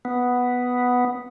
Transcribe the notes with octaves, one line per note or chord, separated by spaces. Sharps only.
B3